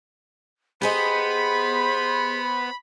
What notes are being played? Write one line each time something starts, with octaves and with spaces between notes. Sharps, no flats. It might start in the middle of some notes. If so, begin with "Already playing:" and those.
B3 G4 G#4 C5 D#5 B5